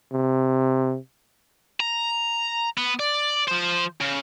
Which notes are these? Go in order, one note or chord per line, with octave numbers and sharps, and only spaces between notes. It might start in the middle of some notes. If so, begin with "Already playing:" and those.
C3
A#5
B3
D5
F3 C5
C#3